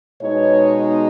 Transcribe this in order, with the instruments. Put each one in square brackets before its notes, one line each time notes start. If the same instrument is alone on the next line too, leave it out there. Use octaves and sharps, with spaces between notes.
[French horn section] B2 G#3 B3 D#4 C#5